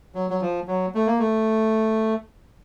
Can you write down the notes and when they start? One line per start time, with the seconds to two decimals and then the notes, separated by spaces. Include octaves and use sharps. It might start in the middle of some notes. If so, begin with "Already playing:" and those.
0.15 F#3
0.30 F#3
0.41 F3
0.67 F#3
0.95 A3
1.07 A#3
1.19 A3